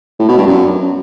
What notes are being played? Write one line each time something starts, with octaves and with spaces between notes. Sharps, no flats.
A2
B2
G2
F#2